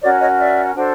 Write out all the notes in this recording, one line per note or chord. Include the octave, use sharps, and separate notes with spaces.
C#4 F#4 A#4 C#5 D5
C#5 D#5
D5 E5
D4 F#4 A4 C5